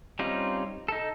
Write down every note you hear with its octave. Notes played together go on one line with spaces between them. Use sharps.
G3 C4 C#4 D#4 F4
D#4 A4